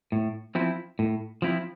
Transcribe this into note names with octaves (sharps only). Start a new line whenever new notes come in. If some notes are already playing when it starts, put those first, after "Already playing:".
A2
F3 C4 E4
A2
F3 C4 E4